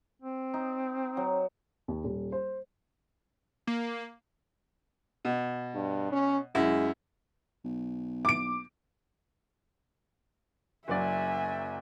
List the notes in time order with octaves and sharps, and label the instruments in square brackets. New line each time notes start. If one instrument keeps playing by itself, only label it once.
[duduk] C4
[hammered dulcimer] D#4
F#3
[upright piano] D#2
D#1
C5
[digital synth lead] A#3
[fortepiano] B2
[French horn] G2
C#4
[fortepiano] F#2 E4 [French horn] G#3
[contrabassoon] B1
[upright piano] D6 D7
[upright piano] F#1 F#3 D5 [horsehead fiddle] E5 G#5